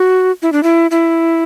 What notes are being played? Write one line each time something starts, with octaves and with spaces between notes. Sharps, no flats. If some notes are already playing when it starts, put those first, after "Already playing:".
Already playing: F#4
E4
D4
E4
E4